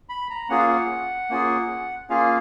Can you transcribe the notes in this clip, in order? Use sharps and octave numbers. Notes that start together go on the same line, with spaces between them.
B5
A#5
A#3 C#4 F4 G#4 F#5
F5
F#5
A#3 C#4 F4 G#4
A#3 C#4 F4 G#4 F5